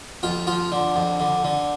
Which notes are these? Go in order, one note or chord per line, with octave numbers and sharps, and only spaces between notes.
F2 F4
F3 F4
D3
F2
D3
D3